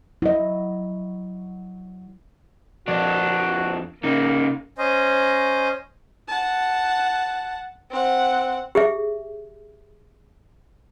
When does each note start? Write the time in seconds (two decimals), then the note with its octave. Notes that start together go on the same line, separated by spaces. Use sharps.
0.22 F#3 E4 D#5
2.88 F2 D4 F#4
4.04 C#3 A#3 D#4
4.78 C#4 C5 D#5
6.28 F#5 A5
7.91 C4 F#5
8.75 G4 G#4 E5